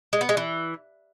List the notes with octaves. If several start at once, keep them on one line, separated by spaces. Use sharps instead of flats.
G#3
B3
G#3
E3